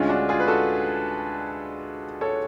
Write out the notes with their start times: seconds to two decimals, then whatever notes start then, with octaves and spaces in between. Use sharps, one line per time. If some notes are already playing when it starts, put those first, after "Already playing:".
Already playing: D2 D3 G#3 C#4 F4
0.09 D4 F#4
0.29 F4 G#4
0.40 B4
0.47 F#4 A4
2.21 A4 C#5